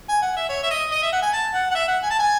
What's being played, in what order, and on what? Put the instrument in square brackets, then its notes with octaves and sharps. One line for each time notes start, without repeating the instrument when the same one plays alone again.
[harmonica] G#5
F#5
E5
C#5
E5
D#5
D#5
E5
F#5
G#5
A5
F#5
F#5
E5
F#5
G#5
A5
G#5